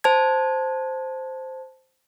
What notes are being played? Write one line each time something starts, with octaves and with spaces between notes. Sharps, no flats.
C5 A5 G#6